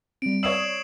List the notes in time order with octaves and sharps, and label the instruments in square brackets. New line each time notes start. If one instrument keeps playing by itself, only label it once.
[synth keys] G3 C4 [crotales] D7
[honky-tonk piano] C#5 D#6 E6 [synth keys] D5 [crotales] C7 E7 F#7